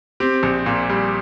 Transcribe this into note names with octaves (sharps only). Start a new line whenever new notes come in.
C4 G4
A#1
A#2
G3